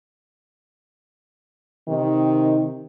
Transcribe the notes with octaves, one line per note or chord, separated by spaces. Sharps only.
C3 D#3